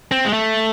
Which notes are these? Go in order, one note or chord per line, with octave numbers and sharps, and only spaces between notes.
C4
G#3
A3